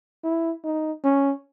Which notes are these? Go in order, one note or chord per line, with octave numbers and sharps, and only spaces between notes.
E4
D#4
C#4